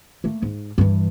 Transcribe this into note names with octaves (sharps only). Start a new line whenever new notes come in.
A3 A#3
G#2
G2 E3